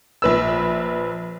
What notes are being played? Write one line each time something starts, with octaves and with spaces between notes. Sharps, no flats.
A#1 B4 E6